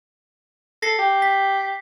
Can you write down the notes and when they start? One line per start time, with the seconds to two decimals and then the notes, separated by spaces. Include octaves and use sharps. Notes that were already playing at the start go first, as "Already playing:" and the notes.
0.82 A4 A#6 C7
0.99 G4
1.22 B6